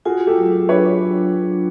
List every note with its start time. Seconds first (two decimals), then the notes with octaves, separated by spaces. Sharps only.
0.05 F4 F#4 G#4
0.27 G4 A4
0.38 F#3
0.69 D4 B4 C#5